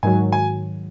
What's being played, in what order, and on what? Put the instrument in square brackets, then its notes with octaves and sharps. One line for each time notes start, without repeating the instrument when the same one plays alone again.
[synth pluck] G#2 D#3 F#3 [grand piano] G#5
[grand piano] G#5